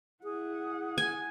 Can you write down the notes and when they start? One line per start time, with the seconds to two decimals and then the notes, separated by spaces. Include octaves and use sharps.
0.24 E4 G#4 F#5
0.98 G#5